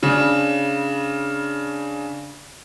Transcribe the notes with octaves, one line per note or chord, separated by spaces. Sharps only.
C#3 D4